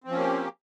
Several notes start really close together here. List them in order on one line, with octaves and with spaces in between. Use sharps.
C4 F3 C#4 A#3 G4